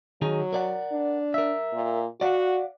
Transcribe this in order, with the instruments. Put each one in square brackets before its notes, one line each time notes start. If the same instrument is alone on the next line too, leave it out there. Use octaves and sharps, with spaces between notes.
[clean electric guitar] D#3 D#4 G#4 [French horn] F#3
[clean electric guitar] A#4 D5 F#5
[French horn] D4
[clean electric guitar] A#4 E5
[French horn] A#2
[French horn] F#4 [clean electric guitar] D5 F5 F#5